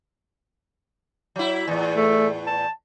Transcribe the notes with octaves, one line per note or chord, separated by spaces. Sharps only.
F#3 E4
E2 A2
A3
A5